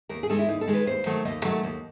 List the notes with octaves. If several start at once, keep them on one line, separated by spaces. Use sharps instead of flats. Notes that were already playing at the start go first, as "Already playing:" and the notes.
D#2 A#4
G#4
D#3 G#3 A4
E4
D#2 D#4
A4
D#3 G#3
B4
D#2 C5
D#3 F#3 A3
D#2 D#5
D#3 F#3 A3
D#2